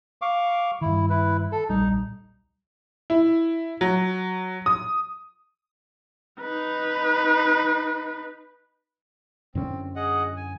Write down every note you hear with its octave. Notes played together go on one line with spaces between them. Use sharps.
F5 C#6 D6
G2 D#3 E4
E4 B4
A4
D1 A#1 G3 D#4
E4
F#3
D#6
D#4 B4
F#2 D3 C4 C#4
G#4 D#5 F#5
G#5